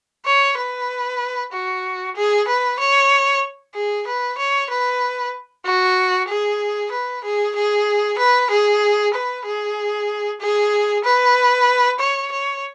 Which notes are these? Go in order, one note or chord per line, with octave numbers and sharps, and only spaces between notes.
C#5
B4
F#4
G#4
B4
C#5
G#4
B4
C#5
B4
F#4
G#4
B4
G#4
G#4
B4
G#4
B4
G#4
G#4
B4
C#5
C#5